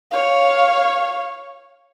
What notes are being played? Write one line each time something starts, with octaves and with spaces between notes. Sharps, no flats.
C#5 F5